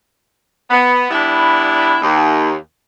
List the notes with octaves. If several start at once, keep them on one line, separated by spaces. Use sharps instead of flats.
B3
G3 B3 D4 E4
D#2